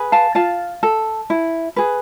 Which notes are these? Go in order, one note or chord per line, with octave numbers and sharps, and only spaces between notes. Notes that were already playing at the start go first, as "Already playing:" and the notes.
Already playing: G#4 B4
F5 A5
F4 F5 A5
A4
E4
G#4 B4